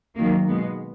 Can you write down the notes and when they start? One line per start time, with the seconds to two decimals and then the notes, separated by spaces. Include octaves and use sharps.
0.15 D#3 F#3 A#3
0.47 B2 G#3 B3